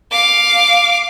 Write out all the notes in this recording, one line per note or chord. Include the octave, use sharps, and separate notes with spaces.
F5 D6